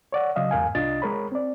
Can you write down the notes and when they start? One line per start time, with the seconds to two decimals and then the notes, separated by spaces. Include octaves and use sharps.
0.12 C#5 D5 F#5
0.36 C#3 F#3 D#5 F5
0.51 E2 G#2 A#4 F5 G#5
0.75 C2 D4 F4 D#5 A6
1.02 G#3 A#4 C#5 B5
1.32 C4 D5